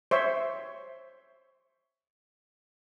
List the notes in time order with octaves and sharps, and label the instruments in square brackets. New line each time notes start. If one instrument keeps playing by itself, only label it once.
[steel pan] C5 C#5 E5